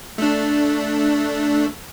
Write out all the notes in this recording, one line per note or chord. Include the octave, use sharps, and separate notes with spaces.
A3 D4